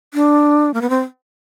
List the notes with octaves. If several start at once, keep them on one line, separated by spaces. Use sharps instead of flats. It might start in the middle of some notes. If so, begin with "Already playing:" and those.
D4
A#3
B3
C4